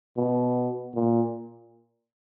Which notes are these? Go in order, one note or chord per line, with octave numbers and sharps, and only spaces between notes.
B2
A#2